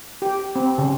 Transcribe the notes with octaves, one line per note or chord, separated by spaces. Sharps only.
G4
C4
C#3